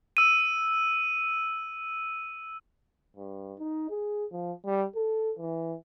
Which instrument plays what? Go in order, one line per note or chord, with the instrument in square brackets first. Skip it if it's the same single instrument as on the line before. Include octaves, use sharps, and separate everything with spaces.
[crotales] E6 D#7
[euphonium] G2
D#4
G#4
F3
G3
A4
E3